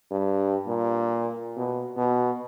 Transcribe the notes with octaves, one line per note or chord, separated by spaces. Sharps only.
G2
A#2
B2
B2